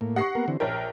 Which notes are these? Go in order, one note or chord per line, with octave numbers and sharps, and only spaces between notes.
A2 A#3
G4 F#5 C#6 A#6 C7
A#3 B3 A#4
D3 E3 C4
A#1 A#4 C#5 G5